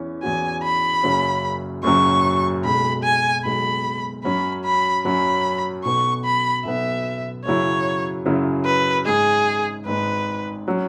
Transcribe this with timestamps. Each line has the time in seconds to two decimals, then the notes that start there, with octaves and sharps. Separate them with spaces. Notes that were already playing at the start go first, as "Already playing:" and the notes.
Already playing: E2 E3 C#4
0.23 E2 E3 C#4 F#4 G#5
0.64 B5
1.03 F#1 F#2 C#3 F#3 C#4
1.83 F#1 F#2 C#3 F#3 C#4 C#6
2.64 B1 B2 G#3 B5
3.03 G#5
3.44 B1 B2 G#3 B5
4.24 F#2 F#3 C#4 B5
4.64 B5
5.05 F#2 F#3 C#4 B5
5.84 B1 B2 B3 C#6
6.24 B5
6.65 B1 B2 B3 E5
7.45 F#2 C#3 F#3 E4 C#5
8.25 F#2 C#3 F#3 E4
8.65 B4
9.06 G#1 G#2 G#3 G#4
9.86 G#1 G#2 G#3 B4
10.68 F#3 C#4